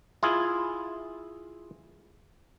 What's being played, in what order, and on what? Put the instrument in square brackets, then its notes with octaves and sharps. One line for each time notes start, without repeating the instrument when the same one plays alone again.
[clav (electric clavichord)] E4 F4 G#4